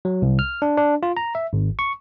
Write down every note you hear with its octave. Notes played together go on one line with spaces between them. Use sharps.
F#3
C2
F6
D4
D4
F4
A#5
E5
G#1
C#6